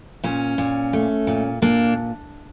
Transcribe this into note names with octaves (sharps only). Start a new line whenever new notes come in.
A#2 C#4
A#2
A3
A#2
A#2 A#3 D4